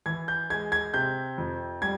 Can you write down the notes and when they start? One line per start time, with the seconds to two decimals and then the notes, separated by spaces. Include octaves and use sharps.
0.06 E3 G#6
0.28 G6
0.50 G#3 G#6
0.72 G#6
0.94 C3 G6
1.38 F2
1.82 G3 G#6